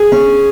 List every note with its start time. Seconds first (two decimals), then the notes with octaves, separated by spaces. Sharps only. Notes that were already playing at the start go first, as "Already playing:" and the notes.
Already playing: G#4
0.12 C#4